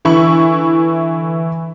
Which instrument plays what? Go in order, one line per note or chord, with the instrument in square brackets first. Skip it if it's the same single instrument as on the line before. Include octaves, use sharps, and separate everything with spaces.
[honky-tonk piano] D3 E3 E4 C#6 F#7